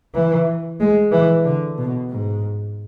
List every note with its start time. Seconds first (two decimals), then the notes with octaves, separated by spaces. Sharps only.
0.14 E3
0.80 G#3
1.12 E3
1.44 D3
1.78 B2
2.10 G#2